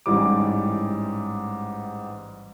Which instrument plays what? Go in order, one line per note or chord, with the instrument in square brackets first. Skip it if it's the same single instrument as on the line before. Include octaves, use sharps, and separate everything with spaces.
[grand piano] A1 G#2 E3 G3 D6